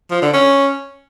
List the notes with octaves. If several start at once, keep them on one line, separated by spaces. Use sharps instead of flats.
F3
D3
C#4